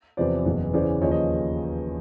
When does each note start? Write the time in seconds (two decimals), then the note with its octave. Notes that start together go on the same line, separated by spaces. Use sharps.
0.17 E2 C3 F3 C5 D5
0.46 F#1 E2 B2
0.74 E2 C#3 E3 C5 D5
1.01 D#2 C#3 F3 C#5 D#5
1.11 C#5 D#5